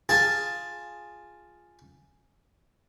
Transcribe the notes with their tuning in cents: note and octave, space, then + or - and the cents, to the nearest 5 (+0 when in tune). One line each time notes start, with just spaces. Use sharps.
F4 +0 G#4 +0 A5 +5